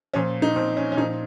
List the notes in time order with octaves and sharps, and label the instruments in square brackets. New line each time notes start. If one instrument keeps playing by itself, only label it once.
[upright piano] A#2 F3 C#4
D#4
A#2 F3 C4
C#4
C#4
A#2 F3 D#4